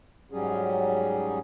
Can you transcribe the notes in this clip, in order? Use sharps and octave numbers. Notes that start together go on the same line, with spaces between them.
G#2 F#3 G3 C#4 G#4